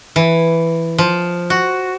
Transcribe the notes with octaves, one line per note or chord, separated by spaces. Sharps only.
E3
F3
F#4